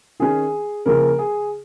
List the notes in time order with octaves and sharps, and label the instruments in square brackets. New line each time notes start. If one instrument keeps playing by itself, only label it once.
[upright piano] D#3 C#4 G#4
C#3 F3 A#3 C#4 A#4
G#4